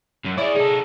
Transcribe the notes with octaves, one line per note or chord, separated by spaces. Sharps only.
F#2
E4 G#4 C#5 D5 E5
D#4 G#4 A4